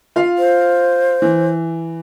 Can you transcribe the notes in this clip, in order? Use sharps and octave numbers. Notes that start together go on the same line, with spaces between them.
F4 F5
C5
E3